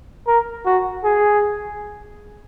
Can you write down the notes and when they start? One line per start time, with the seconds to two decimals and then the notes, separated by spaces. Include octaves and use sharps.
0.27 A#4
0.66 F#4
1.04 G#4